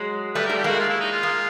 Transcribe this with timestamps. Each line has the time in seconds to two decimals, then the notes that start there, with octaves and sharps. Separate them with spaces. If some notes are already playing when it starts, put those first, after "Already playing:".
Already playing: F#3 G#3
0.35 G3 A3 B4
0.46 A#4
0.49 G3 A3
0.56 G4
0.64 G#3 A#3 F#4
0.79 F4
0.89 E4
1.00 D#4
1.12 F4
1.23 G#3 A#3